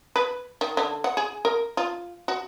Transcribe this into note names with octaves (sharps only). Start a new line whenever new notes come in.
B4
D#3
D3
F#5
G#4
A#4
F4
F#4